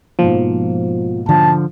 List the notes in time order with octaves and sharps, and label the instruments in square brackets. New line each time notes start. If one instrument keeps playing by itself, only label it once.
[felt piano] G#2 B2 A#3 [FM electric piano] F3
[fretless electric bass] D3 F3 [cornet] A5